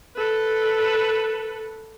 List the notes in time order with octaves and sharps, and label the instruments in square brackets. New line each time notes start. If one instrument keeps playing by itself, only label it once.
[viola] A4 B4